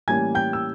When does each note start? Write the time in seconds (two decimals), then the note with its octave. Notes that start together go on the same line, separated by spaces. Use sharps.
0.08 A2 E3 G3 A#3 C#4 G#5 G#6
0.35 G5 G6
0.53 E6